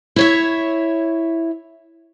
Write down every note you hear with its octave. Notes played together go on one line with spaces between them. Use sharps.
E4 C#5 E5